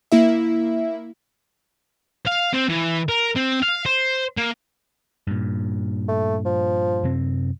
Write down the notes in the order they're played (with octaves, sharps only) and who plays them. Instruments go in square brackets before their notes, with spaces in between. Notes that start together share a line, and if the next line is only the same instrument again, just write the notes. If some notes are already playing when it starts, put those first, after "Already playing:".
[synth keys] A#3 E4 E5
[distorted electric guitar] F5
C4
E3
A#4
C4
F5
C5
A#3
[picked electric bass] G2 A#2
[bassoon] A3
F3
[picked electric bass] F#2 C3 C4